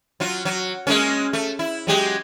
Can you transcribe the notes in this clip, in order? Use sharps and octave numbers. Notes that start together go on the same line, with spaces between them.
F#3 F4
F#3
G#3 A#3 C#4
A3
E4
F#3 G#3 G4